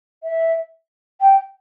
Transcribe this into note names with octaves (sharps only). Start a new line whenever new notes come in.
E5
G5